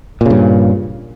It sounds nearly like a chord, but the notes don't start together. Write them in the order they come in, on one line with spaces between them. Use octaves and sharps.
A#2 C#3 G2